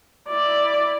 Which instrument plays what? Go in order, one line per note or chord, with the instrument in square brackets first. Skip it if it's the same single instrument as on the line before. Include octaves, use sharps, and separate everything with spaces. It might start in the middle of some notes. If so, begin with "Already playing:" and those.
[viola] E4 D5